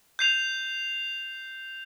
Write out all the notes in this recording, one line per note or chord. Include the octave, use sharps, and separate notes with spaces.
G6 C7 F7